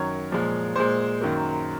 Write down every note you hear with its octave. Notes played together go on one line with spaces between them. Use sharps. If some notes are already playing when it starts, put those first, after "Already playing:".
Already playing: F#2 D#3 F#3 C#5
A#2 F3 G#3
A#2 G#3 C5
F#2 D#3 F#3 A#3